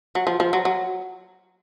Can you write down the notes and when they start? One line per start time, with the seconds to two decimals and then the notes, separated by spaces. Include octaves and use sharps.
0.15 F#3
0.27 F3
0.40 F3
0.53 F#3
0.65 F#3